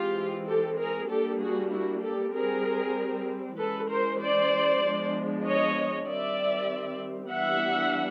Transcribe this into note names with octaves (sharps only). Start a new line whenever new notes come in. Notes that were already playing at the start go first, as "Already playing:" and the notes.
Already playing: E3 G#3 C4 F4 G4
G4 A4
G#4 A#4
G3 A#3 D4 G4 A4
F#4 G#4
E4 F#4
G4 A4
G3 C4 G#4 A#4
E3 G#3 C#4 A4 B4
A#4 C5
C5 D5
F3 G#3 B3 D4
C#5 D#5
D#3 G3 C4 D5 E5
E3 G3 B3 D4 E5 F#5